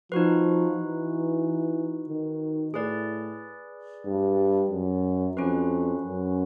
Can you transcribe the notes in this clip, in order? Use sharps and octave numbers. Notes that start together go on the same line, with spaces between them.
F3 D#4 F#4 B4
E3
D#3
A2 G#4 B4 D5
G2
F#2
F2 C#4 F#4 B4
F#2